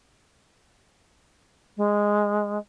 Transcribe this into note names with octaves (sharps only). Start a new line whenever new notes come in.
G#3